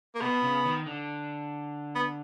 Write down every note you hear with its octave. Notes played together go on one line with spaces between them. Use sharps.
A#3
B2 B3
C#3
D#3
D3
B3